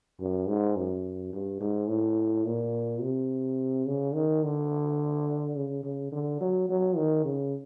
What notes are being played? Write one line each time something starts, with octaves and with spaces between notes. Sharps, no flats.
F#2
G#2
F#2
G2
G#2
A2
A#2
C3
C#3
D#3
D3
C#3
C#3
D3
F#3
F#3
D#3
C#3